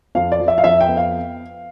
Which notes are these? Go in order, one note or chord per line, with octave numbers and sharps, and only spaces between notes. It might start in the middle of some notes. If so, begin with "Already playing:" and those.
F2 F5
D5
F3
E5
F5
F2 E5
G5
B3
F5